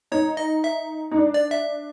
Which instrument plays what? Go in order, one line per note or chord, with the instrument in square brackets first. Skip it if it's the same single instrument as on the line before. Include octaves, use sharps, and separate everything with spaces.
[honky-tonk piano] D#4 [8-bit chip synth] C#5
[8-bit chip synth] D#5
E5
[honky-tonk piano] D#4
D4
[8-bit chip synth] D5
E5